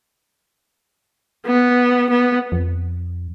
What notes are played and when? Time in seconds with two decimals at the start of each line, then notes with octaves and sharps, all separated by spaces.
1.46 B3
2.10 B3
2.52 F2